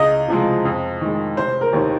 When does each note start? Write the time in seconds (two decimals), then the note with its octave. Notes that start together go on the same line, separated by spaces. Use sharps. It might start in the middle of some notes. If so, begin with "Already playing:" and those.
Already playing: C#2 D#5
0.28 C3 F3 G#3
0.65 F2
1.01 D#3 G#3
1.37 F1 C5
1.61 A#4
1.73 D#2 D#3